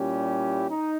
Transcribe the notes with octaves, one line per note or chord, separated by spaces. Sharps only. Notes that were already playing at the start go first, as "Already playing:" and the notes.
Already playing: A#2 G3 C#4 E4 G4
D#4